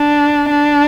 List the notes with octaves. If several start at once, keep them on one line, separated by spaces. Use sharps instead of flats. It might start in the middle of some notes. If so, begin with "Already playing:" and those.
Already playing: D4
D4